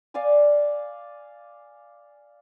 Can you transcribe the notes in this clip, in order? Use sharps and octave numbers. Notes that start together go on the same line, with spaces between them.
D5 F5 G#5 D6